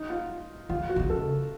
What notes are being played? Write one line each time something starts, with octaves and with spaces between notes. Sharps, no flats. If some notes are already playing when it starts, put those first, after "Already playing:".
Already playing: D#4
F4
D#3 F4
F#4
C3
C#3
A4